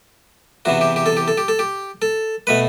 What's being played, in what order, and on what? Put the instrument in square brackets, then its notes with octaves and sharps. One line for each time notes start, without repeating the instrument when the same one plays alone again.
[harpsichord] E2 C3 E3 F#4
G4
G4
A4
G4
A4
G4
A4
G4
A4
B2 A3 B4